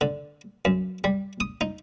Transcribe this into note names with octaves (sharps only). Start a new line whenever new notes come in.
D3
F#2
G3
D#6
D#4